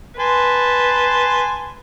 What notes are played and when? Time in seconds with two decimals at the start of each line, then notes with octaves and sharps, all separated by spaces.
0.19 B4 G#5 A5 C6